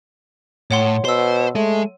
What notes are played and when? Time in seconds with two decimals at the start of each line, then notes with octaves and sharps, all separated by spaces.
0.71 A2 C#5 F#5 C6
1.05 B2 C5 C6 E6
1.56 G#3 A3